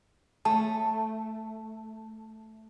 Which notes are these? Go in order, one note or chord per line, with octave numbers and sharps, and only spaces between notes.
A3 A5